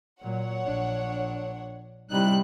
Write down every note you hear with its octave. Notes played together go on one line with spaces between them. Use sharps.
A#2 F#3 C#5 F#5
A#1 D4
C3 G3 D#4 E4 F#6